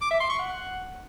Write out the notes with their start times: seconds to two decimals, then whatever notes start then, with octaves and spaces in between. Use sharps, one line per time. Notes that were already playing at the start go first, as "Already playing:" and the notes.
0.01 D6
0.11 E5
0.20 C6
0.30 C#6
0.39 F#5